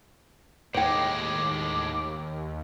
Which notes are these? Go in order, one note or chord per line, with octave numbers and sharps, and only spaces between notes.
D#2 A2 G#3 C#5 G5 D6